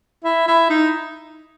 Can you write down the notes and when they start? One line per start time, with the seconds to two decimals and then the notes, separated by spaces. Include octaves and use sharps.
0.24 E4
0.48 E4
0.70 D#4